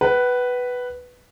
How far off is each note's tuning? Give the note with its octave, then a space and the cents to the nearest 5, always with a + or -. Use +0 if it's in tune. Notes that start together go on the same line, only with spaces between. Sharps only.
B4 +0 F#5 +40